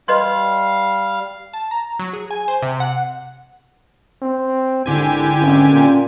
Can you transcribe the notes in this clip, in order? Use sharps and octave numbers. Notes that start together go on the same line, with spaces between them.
G3 B4 D#5 F5 C6
A5
A#5
F#3
G#4
G#5
C5
C3
F#5
C4
G#1 D3 E4 G4 G#5
G#1 C#4
A#2